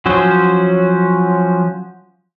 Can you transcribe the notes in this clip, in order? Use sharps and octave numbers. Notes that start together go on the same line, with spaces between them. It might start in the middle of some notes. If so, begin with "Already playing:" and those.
F3 F#3 C#4 F#4 C5